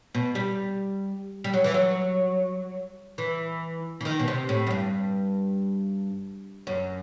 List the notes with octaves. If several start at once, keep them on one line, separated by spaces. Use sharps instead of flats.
B2
G3
G3
F#3
E3
F#3
E3
E3
D#3
B2
C3
A2
F#2
G2
F#2